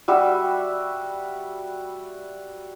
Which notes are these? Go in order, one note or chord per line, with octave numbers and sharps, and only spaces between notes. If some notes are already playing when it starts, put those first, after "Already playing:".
G3 F#4 E5 B5